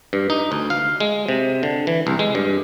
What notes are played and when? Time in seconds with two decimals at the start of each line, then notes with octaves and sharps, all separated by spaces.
0.13 G2
0.30 D#4
0.52 D2
0.70 F5
1.00 G#3
1.29 C3
1.63 D3
1.87 E3
2.07 C2
2.19 G#3
2.35 G2